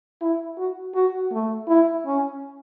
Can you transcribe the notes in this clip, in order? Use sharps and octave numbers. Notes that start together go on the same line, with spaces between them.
E4
F#4
F#4
A3
E4
C#4